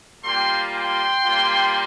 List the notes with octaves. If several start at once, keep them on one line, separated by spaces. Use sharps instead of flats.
G3 A#3 F4 G5 C6
G5 C6
G3 A#3 F4